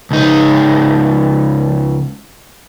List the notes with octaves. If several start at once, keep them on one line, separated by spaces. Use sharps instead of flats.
C#2 D#4